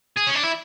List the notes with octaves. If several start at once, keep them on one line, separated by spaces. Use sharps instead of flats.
G#4
C#4
D4
E4